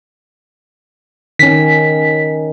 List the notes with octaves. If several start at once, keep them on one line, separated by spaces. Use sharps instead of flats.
D#3 C#4 B6